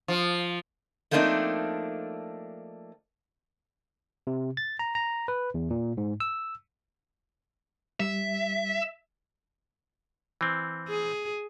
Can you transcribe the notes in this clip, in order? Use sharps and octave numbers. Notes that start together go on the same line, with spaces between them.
F3
F3 A3 A#3 C4 D4 D#4
C3
A6
A#5
A#5
B4
E2
A#2
G#2
E6
G3 E5
E3 C4
G#4